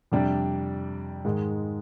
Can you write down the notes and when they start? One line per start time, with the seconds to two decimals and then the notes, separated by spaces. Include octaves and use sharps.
0.12 F2 C3 G3 D4
1.25 G#2 D#3 G#3